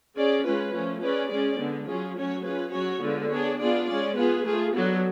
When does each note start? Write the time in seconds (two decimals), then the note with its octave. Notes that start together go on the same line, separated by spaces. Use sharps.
0.16 C#4 G#4 D5
0.45 G#3 C#4 F4 B4
0.73 F3 A3 C#4
1.02 C#4 G#4 B4 D5
1.30 G#3 C#4 G#4 D5
1.59 D3 G#3 B3
1.88 F#3 C#4 F4 G#4
2.16 F#3 A3 C#4 F#4 C#5
2.45 C#4 F4 G#4 B4
2.73 F#3 C#4 F#4 C#5
3.01 D3 G#3 B3 F4
3.31 B3 D4 G#4 C#5
3.59 B3 D4 F4 G#4 D5
3.88 G#3 C#4 G#4 D5
4.17 B3 F4 G#4 B4
4.45 A3 F4 G#4
4.74 F#3 B3 D4 F#4 A4